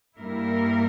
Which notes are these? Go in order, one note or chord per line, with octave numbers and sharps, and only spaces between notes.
G2 G3 A#3 E4 A#4